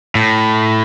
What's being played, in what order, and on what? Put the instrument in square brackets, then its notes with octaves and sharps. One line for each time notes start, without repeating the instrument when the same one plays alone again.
[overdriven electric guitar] A2